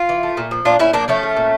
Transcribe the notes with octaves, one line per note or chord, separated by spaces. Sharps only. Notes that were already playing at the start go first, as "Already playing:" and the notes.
Already playing: F4
E3
A3
A#2
F3
A#2 D4 F4
A#2 C#4 E4
F3 A#3 D4
F3 A3 C#4
F3
A#2